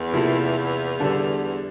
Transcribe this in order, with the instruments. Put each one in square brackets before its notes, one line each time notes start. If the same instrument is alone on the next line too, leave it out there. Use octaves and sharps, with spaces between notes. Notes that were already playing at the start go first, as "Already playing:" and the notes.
Already playing: [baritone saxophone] E2
[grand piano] C3 F3 A#3 E4 A4
D3 G3 D4 A4